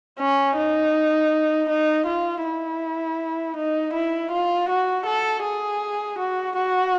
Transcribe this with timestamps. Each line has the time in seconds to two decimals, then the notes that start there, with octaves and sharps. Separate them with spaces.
0.19 C#4
0.57 D#4
1.69 D#4
2.07 F4
2.44 E4
3.57 D#4
3.94 E4
4.32 F4
4.69 F#4
5.06 A4
5.44 G#4
6.19 F#4
6.56 F#4